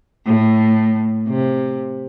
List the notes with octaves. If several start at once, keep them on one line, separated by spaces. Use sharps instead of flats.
A2
C3